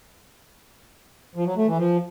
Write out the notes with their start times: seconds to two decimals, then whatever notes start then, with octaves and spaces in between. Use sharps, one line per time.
1.35 F3
1.46 F#3
1.56 A3
1.67 E3
1.78 F3